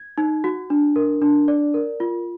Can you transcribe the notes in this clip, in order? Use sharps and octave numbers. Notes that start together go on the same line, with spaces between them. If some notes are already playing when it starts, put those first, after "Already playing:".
Already playing: G#6
D#4
F#4
D4
A#4
D4
D5
A#4
F4